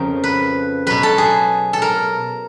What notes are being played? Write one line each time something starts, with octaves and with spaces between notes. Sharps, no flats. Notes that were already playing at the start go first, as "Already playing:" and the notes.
Already playing: F2 C#3 F3 A#4
B4
B2 F#3 B4
A4
G#4
A4
A#4